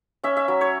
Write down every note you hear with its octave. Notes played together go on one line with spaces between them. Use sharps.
C#4 E5
E5
F#3
C#5